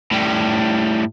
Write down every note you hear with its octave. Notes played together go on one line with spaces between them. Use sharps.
A2 G3